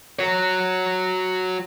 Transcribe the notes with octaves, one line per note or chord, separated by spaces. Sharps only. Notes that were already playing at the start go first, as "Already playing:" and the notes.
F#4 C#5